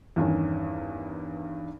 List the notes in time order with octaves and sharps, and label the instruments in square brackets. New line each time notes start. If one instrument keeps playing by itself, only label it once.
[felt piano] E2 G2 D#3 C#4